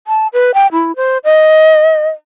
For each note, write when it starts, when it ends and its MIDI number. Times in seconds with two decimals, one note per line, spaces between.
0.07 0.27 81
0.33 0.51 71
0.54 0.67 79
0.73 0.95 64
0.96 1.18 72
1.24 2.07 75